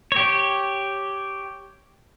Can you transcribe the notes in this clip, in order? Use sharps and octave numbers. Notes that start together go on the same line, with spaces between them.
G4 C#5